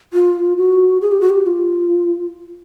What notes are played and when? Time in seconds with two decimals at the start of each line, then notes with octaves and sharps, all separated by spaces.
0.13 F4
0.58 F#4
1.02 G#4
1.12 G4
1.21 F#4
1.30 G4
1.46 F4